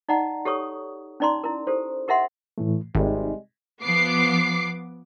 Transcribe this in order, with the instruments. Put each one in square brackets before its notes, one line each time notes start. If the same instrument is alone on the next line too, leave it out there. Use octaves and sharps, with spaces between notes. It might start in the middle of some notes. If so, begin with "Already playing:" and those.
[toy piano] D#4 D5 D#5 F#5 A#5
G4 A4 C#5 C#6 D#6
C#4 D#4 D5 A#5 C6
E4 A#4
G4 A4 C5
G4 A#4 D#5 E5 F#5 C6
[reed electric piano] A2 E3 A3
[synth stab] G#1 [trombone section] C3 G3 G#3 [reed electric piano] D#4
[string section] F3 B3 D6 C7